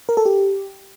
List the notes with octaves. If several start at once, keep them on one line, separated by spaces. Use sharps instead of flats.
A#4
A4
G4